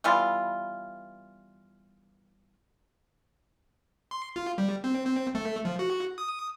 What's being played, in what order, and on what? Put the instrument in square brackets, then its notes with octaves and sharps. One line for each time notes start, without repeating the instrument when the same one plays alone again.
[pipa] E3 G3 B3 F4
[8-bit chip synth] C6
F4
G3
C4
C4
A3
F3
F#4
D#6